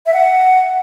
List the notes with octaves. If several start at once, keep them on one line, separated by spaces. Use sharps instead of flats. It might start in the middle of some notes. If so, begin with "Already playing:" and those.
E5
F#5